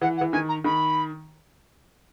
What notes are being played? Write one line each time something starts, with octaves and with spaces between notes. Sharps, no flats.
E3 F#5
F#5
E3
D#3 G#5
A#5
D#3 B5